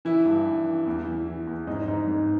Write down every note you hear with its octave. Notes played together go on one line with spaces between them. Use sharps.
E3 E4
G2
E3
E3
E2
E3
E3
E2
G#2 D#4
G#2
G#2